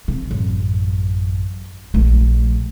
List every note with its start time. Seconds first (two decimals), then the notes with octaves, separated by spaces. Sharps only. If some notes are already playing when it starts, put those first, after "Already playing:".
0.08 C3
0.31 A1 F#2
1.94 A#1 A3